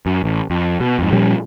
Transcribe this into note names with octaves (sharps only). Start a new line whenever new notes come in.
F#2
A1
F2
B2
F2 G#2
A#2 F3 G3 C#4